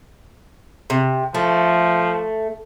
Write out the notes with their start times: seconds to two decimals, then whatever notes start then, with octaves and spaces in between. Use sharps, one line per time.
0.90 C3
1.35 F3 A3